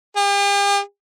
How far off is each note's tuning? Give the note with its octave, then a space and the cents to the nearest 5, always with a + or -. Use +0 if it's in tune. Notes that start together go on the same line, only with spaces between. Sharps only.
G4 +45